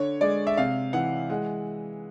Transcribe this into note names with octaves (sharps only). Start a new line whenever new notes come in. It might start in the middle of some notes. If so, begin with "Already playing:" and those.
Already playing: D3 C#5
G#3 D5
E5
C3 F5
E3 F#5
G#3 F#5